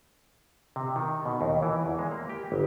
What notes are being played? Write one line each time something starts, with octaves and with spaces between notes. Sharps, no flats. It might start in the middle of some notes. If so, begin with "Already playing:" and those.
C3
D#3
B2
D#2
E3
E2
G#3
A#3
G4
G1